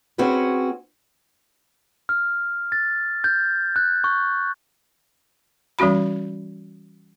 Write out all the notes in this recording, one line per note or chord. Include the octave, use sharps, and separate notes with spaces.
C4 C#4 F#4 G#4 B4
F6
A6
G6
F#6
C#6
E3 G3 C#4 F#4 B5